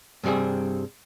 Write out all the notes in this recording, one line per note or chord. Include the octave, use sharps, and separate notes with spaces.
G2 C3 G3 C4 G#4